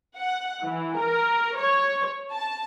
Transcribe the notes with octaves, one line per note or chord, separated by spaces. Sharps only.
F#5
E3
A#4
C#5
A5